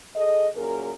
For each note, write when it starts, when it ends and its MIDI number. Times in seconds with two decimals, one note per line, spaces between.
0.15 0.48 68
0.15 0.48 69
0.15 0.48 75
0.55 0.92 42
0.55 0.92 46
0.55 0.92 68
0.55 0.92 70